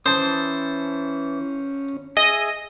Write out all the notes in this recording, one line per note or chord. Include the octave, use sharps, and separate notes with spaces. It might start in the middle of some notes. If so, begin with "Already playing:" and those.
E3 C#4 C5 A5 D#6
G#4 D#5 E5